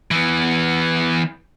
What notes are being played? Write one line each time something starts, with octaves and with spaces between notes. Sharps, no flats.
E3 B3